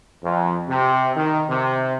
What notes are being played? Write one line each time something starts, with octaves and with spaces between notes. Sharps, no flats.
F2
C3
D#3
C3